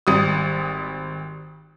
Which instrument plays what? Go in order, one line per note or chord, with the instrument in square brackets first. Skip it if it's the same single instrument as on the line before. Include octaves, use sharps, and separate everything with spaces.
[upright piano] G#1 G3 D#6